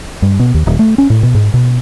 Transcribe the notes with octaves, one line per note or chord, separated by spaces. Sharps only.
G2
B2
D#2
D#1
A3
C#4
A2
B2
G#2
B2